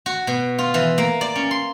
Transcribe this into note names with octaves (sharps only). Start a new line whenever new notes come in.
F#4
B2
F4
E3
A#3
D5
C#4
C6